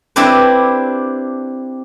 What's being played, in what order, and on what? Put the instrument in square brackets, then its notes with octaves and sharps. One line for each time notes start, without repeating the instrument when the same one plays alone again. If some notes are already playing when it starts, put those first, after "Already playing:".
[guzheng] C4 D4 E4 G4 B4